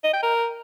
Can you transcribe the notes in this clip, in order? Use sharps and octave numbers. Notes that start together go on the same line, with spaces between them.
D#5
G5
A#4